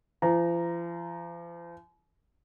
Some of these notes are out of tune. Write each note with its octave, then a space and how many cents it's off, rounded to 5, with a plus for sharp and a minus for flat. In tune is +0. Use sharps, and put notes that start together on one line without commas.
F3 -40 A#5 +0